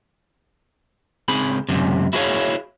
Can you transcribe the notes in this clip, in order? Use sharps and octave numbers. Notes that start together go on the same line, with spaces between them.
C#2 C4 G#4 B5
C#2 F#2 C3
E4 F#4 G#4 B4 C#5 F5